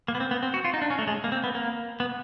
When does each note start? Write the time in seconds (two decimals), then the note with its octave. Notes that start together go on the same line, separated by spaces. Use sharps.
0.08 A#3
0.15 B3
0.20 C4
0.31 B3
0.43 C4
0.54 F#4
0.65 F4
0.74 D#4
0.82 D4
0.90 C#4
0.99 A3
1.07 G#3
1.24 A#3
1.32 C4
1.44 B3
1.55 A#3
2.00 B3